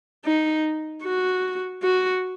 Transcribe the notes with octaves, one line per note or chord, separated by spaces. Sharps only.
D#4
F#4
F#4